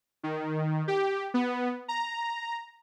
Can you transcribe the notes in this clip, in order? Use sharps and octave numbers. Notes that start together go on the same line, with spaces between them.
D#3
G4
B3
A#5